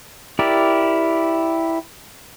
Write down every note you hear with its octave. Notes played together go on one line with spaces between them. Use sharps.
E4 G4 A#4 D5